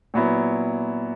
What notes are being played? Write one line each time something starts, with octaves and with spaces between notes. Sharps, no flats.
A#2 F#3 B3 E4